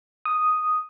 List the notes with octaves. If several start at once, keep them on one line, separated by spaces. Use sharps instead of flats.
D#6